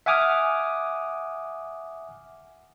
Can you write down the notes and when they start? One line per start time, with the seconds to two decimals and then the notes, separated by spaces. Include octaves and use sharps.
0.06 E5 F#5 G#5 D6 D#6 F6